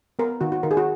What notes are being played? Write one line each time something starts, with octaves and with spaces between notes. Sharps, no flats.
B3 A#4
D#3 F#4
F#4
D#3 A#4
G#4
F#4